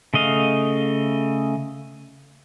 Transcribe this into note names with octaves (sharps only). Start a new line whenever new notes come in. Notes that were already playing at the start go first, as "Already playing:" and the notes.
C#3 A3 D#5 F5